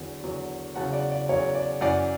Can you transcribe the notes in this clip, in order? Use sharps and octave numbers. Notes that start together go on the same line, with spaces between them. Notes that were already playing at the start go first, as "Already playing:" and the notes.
Already playing: E2 D3 F#3
E2 D3 F#3
E2 C#3 F#3 F#5 A5
D5 F#5
D5
E2 C#3 F#3 C#5
D5
F#2 E3 D5 F#5